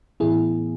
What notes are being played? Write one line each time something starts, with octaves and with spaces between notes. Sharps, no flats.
A2 E3 B3 E4 G#4